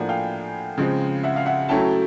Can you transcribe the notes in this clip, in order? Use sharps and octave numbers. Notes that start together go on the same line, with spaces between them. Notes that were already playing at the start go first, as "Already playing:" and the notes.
Already playing: A2 F3 A#3 D4 F#5 G#5
F5 G5
C#3 F3 G#3 C4
E5 F#5
F5
E5 F#5
F#3 A3 C#4 E4 G5 A5